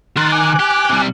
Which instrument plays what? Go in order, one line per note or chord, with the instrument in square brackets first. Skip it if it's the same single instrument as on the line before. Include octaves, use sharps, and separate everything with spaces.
[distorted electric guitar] D#3 A#4 [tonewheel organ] C6 F#6 A6
[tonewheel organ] G#5 D6 F#6
[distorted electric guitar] G4
C3 G3